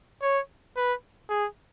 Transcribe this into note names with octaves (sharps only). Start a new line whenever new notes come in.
C#5
B4
G#4